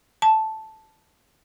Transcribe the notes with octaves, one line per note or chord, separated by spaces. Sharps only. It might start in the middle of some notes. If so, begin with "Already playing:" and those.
A5